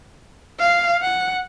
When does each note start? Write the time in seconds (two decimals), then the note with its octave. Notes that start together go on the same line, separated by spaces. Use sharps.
0.59 F5
1.02 F#5